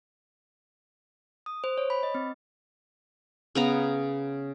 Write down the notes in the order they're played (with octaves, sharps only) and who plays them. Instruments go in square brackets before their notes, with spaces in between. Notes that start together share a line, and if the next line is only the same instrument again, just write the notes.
[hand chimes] D#6
C5
C#5
B5
D#5
C4
[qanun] C#3 B3 A#5